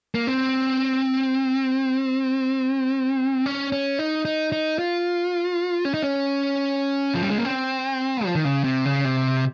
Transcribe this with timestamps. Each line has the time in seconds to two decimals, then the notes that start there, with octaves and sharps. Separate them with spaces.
0.15 A#3
0.27 C4
3.46 C#4
3.72 C#4
3.99 D#4
4.25 D#4
4.52 D#4
4.79 F4
5.85 C#4
5.94 D#4
6.03 C#4
7.15 F3
7.22 G3
7.30 G#3
7.38 A#3
7.45 C4
8.25 F3
8.35 D#3
8.45 C#3
8.64 C3
8.85 C#3
9.05 C3